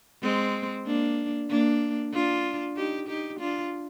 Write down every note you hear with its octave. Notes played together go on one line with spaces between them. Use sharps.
G#3 C4
A#3 D4
A#3 D4
D4 F4
D#4 G4
D#4 G4
D4 F4